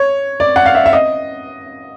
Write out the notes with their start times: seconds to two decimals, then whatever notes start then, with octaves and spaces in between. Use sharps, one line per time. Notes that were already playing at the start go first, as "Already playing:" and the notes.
Already playing: C#5
0.40 D5
0.56 F#5
0.66 F5
0.75 E5
0.86 E5
0.93 D#5